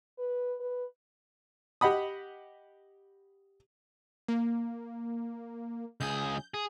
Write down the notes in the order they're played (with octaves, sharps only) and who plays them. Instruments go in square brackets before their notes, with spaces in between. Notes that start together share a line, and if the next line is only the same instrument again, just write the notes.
[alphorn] B4
B4
[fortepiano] G4 D#5 F#5 B5 D#6
[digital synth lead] A#3
[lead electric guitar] C#2 G#4 [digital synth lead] G6
[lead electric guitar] G#4